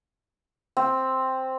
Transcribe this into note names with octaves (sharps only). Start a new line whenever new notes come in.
C4